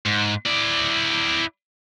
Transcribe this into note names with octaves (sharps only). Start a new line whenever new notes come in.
G#2
E4 D5